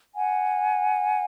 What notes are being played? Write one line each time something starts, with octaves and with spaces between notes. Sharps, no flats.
F#5 G#5